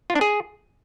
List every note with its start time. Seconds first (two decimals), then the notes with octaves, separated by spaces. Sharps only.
0.10 F4
0.15 D4
0.21 G#4